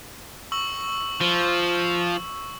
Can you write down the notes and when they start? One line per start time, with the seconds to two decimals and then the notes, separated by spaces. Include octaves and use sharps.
0.52 C#6 E6 F#7
1.21 F3